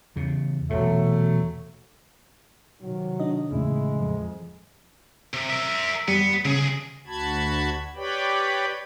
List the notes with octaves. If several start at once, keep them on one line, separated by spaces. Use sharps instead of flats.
E2 C#3
E1 A#2 F#3 A3
C3 D#3 F#3
D4 D#4 D#5
E2 A2 C#3 G#3 E4
F2 F3
C3
A#4 E5
F#2 G3 B3
B1 C#3 G#4
D2 F#4 A5 B5 G#6
G4 B4 C#5 D5 G5 B5